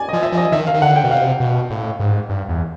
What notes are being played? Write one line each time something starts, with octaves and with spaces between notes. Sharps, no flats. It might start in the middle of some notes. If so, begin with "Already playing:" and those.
Already playing: D5 G#5
D#5
F3
E5
F3
D#5
D#3 E5
F5
D#3
D3 F#5
G5
B2
C3 F5
B2
A2
G#2
G2
E2